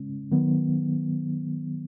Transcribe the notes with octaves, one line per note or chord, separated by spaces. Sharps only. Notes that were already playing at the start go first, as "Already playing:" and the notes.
Already playing: C#3 G#3 C#4
D#3 F#3 B3